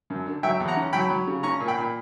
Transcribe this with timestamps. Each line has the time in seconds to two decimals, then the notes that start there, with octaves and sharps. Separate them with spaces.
0.10 F#2
0.26 D3
0.43 F#3 E5 G5
0.60 E2
0.68 F#5 A#5
0.77 C#4
0.93 F#3 G5 B5
1.10 F#3
1.27 C#3
1.43 C#4 A#5 C#6
1.60 A#2
1.68 G5 B5
1.77 A#2